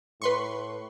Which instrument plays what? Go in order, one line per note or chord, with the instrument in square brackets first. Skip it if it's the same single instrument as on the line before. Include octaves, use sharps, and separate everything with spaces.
[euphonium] A2 [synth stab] B4 C6 C#6